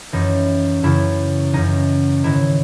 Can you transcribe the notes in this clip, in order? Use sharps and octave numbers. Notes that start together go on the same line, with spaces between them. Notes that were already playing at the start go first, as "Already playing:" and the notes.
F#2 E3 D#4
F#2 C#3 E3 E4
F#2 C#3 E3 D#4
G#2 D#3 F#3 E4